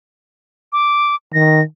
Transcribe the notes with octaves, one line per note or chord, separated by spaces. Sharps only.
D6
D#3 A#6